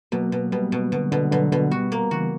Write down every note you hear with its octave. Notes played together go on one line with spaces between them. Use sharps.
B2 F#3 A#3
B2
B2 G3 B3
B2
B2 D3
B2 D3
B2 D3 F#3
B2 D3
G3 B3 F#4
A#3
C#3 E3 F#4